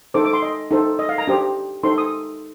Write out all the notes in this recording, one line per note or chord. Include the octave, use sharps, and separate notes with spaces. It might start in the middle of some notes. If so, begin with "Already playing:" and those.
D#4 A4 C5 D6
D6
C6
D#5
D#4 A4 C5
D#5
F5
A#5
D4 G4 C5
D#4 A4 C5 C6
D#6